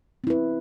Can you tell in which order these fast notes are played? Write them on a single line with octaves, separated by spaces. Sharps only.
C4 E4 B4